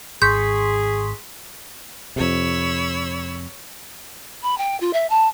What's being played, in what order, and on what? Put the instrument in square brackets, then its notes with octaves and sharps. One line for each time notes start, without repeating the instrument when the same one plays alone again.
[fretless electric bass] G#1 [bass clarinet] G#4 [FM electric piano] C6 C#6 B6 [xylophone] G6
[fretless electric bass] F2 C3 [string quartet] C#5 B5 E6
[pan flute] B5
G5
F4
E5
A5